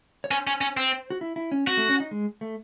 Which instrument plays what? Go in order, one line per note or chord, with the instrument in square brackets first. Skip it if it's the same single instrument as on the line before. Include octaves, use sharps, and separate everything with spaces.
[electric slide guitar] C#5
[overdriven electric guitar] C#4 [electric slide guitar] C5
[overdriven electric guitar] C#4
C#4
C4
[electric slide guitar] F#4
E4
E4
C#4
[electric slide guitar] C4 [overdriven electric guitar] F#4
[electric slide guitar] A3
C#4
D#4
G#3
A3